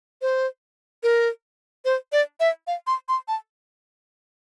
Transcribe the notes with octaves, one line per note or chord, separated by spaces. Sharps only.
C5
A#4
C5
D5
E5
F5
C6
C6
A5